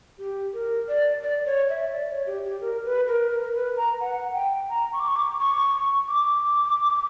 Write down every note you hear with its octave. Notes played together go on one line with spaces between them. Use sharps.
G4
A#4
D5
D5
C#5
E5
D5
C#5
G4
G4
A#4
B4
A#4
A#4
B4
A#5
F#5
G5
A#5
C#6
D6
C#6
D6
C#6
D6